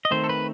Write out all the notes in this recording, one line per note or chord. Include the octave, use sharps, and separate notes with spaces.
D#5
D#3 A3 C4 C5
A4
B4